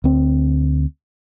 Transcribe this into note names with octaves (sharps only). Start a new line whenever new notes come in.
D2 C4